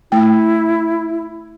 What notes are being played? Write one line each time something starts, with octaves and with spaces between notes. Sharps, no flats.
A3 E4 G5